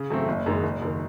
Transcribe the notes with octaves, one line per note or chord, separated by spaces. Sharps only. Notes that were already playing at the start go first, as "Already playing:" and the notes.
Already playing: C#3
F#3 A3 C4
F#1
F#2 D#3 G#3
F#1
F#2 D#3